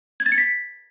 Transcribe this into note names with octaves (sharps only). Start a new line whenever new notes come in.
G#6
A6
C#7
B6